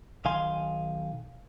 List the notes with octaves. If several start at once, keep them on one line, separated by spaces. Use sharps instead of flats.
B1 D#3 F5 G#5 C6